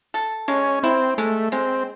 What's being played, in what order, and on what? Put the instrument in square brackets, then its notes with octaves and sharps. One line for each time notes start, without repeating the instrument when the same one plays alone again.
[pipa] A4
[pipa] G#3 [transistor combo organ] C#4
[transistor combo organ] C4 [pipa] E4
[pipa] G#3 [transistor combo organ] A3
[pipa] G#3 [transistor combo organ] C4